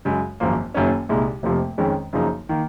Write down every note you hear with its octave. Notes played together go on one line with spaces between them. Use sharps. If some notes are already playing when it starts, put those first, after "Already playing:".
F#2 C#3 G#3
G#1 F#2 F3 A#3
F#1 F#2 D#3 A#3 C#4
C2 A#2 G#3 D#4
F1 F2 C3 F3 A#3
F2 D#3 G#3 C#4
F#2 C#3 F3 A#3 D#4
D#3 A#3